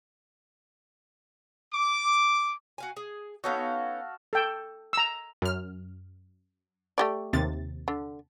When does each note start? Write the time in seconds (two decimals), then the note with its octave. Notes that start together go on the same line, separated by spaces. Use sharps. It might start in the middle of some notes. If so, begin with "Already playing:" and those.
1.73 D6
2.78 F#4 F5 G#5
2.97 G#4
3.44 B3 C#4 D#4 F#4 A4 F5
4.33 A4 G5
4.93 A#5 E6
5.42 F#2 F6
6.98 A3 G4 D5
7.33 D#2 C3 A6
7.88 D3